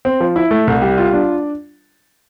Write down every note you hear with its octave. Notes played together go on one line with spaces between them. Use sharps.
C4
F3
E4
A3
C2
G3
F4
D4